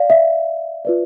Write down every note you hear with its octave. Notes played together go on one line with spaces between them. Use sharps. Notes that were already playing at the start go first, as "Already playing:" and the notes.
Already playing: D5 F5
E5
F4 B4 D5